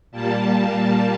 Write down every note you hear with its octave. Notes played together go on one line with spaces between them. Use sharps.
A#2 G3 A#3 A5